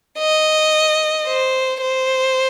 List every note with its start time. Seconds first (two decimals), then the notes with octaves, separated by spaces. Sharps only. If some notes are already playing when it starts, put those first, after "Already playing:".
0.19 D#5
1.27 C5
1.81 C5